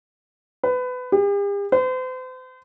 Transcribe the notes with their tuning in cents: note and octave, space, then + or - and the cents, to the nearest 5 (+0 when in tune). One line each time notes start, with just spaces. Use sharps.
B4 +25
G4 +45
C5 -40